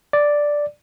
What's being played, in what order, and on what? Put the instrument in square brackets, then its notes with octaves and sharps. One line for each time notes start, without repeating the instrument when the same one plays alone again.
[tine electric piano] D5